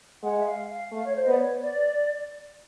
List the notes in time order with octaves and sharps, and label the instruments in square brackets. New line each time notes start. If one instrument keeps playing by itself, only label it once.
[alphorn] G#3 [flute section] F#5
[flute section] E5
F5
F5
[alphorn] A3 [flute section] F5
[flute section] C#5
C5
D#5
[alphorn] B3 [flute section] D5
[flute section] C#5
D5